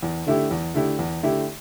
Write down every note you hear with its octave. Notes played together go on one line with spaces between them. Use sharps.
E2
D3 A3 E4 G4
E2
D3 A3 E4 G4
E2
D3 A3 E4 G4